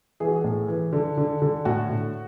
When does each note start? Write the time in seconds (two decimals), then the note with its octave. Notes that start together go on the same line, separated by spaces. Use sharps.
0.20 E3 G#4
0.28 F#4
0.36 G#4
0.44 A2
0.68 E3
0.93 D3
1.18 D3
1.42 D3
1.65 A2 F#4
1.90 A2